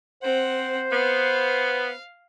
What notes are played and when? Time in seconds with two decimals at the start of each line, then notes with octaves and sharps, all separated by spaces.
0.23 C4 C5 F#5
0.91 B3 F5